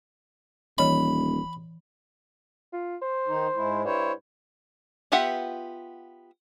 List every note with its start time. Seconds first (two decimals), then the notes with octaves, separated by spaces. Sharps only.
0.78 D#1 E3 C#5 D#5 B5
2.73 F4
3.02 C5
3.27 D#3 D#4
3.55 G#2 G#3 E4
3.84 G2 E4 C5 C#5
5.12 B3 F4 G4 E5 F#5